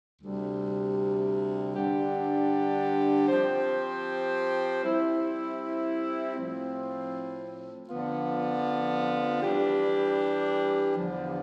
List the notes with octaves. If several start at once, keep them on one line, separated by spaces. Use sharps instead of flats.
D2 C3 G3
G2 D3 G3 D4 G4
F3 C4 G4 C5
G3 C4 E4
A2 F3 C4
F2 D3 F3 B3 F4
E3 G3 D4 G4
E2 D3 F3